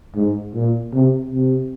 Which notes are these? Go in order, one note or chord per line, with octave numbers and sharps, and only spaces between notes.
G#2
A#2
C3
C3